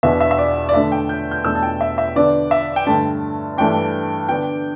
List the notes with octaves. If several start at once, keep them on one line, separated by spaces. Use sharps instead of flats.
E2 B2 B3 D4 E5
E5
E5
D5
D5
D3 A3 D4 E5
G5
G6
G6
E2 B2 A3 D4 E6
A5
G5
E5
E5
D3 B3 D4 D5
E5
G5
G2 D3 A3 A5
G2 E3 A3 D4 G5
D3 B3 D4 G5